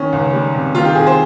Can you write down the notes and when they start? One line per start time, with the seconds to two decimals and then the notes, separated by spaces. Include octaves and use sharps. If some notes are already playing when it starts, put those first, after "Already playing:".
Already playing: D#3 C#4
0.13 C#2
0.33 G3
0.54 C3
0.75 D#3 F4
0.85 G4
0.95 C2 G#4
1.07 C5